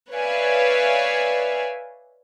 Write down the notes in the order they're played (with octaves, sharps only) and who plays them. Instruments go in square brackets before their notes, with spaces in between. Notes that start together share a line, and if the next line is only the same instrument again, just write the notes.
[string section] B4 C#5 D5 E5 F5 G#5